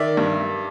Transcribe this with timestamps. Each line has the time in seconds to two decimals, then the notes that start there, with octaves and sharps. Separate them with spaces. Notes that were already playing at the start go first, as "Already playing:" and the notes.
Already playing: D#3 D5 E5
0.17 G2